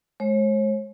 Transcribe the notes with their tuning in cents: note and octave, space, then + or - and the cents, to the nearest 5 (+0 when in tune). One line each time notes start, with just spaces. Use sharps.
G#3 +35 C#5 -40